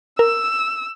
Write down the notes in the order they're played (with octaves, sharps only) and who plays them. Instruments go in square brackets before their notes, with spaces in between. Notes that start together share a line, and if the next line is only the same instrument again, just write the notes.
[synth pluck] A#4 [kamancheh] E6